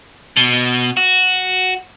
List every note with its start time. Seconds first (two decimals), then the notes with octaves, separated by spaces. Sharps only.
0.37 B2
0.97 F#4